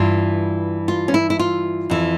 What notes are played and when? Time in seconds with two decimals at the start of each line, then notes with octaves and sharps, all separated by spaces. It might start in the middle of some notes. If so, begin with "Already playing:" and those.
Already playing: G2 E3 F4
0.88 F4
1.08 C#4
1.14 E4
1.30 E4
1.39 F4
1.90 F2 E3